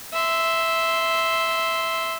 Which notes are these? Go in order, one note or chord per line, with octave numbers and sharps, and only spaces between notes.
E5 C6